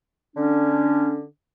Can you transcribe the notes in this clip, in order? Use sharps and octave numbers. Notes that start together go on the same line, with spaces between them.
D3 C#4 D4